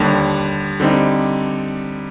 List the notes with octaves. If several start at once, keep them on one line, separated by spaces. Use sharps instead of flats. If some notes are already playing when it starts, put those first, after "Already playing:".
Already playing: D#2 D3 G3
D3 G3 C4 D#4